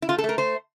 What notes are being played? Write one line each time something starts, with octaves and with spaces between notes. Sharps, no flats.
E4
A3 F4
A4
A3
A#4
A3 C5